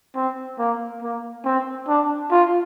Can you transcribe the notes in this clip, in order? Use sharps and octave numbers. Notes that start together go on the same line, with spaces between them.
C4
A#3
A#3
C4
D4
F4